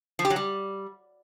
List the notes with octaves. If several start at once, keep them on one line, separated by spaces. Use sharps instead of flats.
F3
G4
F#3
G3